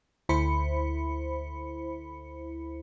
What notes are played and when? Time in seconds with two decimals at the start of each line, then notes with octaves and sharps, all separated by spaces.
0.29 D2 E4 C5 B5 C#7